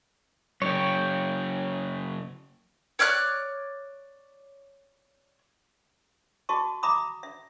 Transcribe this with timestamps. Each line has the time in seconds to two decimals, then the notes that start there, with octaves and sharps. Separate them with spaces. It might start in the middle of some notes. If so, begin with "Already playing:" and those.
0.62 F#2 C#3 C#5 G5
2.99 C#5 D5 F6 F#6
6.49 F#4 G#4 D#5 A5 C#6
6.83 E5 A#5 B5 D6 D#6
7.23 E5